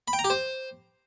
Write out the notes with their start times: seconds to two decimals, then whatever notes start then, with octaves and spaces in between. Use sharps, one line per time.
0.08 B5
0.13 G5
0.19 A#5
0.24 G4
0.30 C5